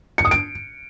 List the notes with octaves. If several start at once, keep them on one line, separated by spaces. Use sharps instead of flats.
C#7
D#6
D7